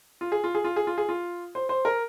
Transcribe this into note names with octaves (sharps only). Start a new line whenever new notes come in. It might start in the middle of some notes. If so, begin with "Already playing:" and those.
F4
G#4
F4
G#4
F4
G#4
F4
G#4
F4
C5
C5
A#4